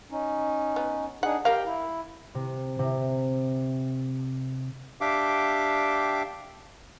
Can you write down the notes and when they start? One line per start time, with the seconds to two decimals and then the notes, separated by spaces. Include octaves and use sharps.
0.11 C#4 D#4
0.76 B3
1.23 D4 D#4 G#4 F#5
1.45 G4 A#4 F5 G5
1.65 E4
2.35 C3
2.79 C3
5.01 D4 G4 E5 F5 G5 D6